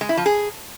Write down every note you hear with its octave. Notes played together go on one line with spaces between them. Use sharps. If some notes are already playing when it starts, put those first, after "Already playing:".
G#3
E4
F3
G#4